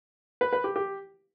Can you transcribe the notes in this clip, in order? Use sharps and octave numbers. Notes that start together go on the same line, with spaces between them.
B4
B4
G4
G4